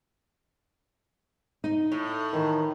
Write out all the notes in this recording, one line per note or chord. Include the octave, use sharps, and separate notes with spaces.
D#4
A2
D#3 E3